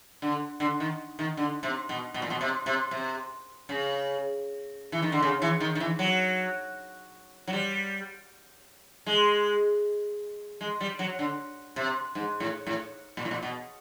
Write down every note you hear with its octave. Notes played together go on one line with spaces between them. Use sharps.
D3
D3
D#3
D#3
D3
C3
B2
B2
A#2
B2
C3
C3
C3
C#3
E3
D#3
D3
C#3
E3
D#3
D#3
E3
F#3
F#3
G3
G#3
G#3
G3
F#3
D3
C3
G#2
A2
A2
A#2
A2
A#2
B2